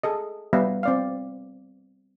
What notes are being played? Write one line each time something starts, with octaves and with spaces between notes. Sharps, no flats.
G#4 A4 D#5
G3 B3 E5 F5
C4 D5 F5